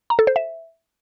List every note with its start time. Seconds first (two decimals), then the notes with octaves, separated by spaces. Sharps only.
0.10 A#5
0.19 A4
0.27 C5
0.36 E5